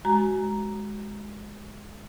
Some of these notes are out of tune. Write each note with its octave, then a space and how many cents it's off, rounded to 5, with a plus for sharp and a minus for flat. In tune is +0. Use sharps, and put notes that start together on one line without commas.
G#3 +0 F#4 +25 A#5 +0